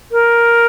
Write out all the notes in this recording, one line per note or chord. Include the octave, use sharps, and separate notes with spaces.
A#4